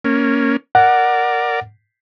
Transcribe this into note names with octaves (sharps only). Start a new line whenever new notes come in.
A#3 C#4
A#4 D5 F#5